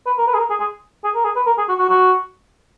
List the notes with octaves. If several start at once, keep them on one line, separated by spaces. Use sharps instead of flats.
B4
A#4
B4
G#4
A#4
G#4
G#4
G#4
A#4
G#4
B4
A#4
G#4
F#4
F#4
F#4